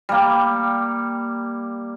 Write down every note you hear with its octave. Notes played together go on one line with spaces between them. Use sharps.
G3 A#3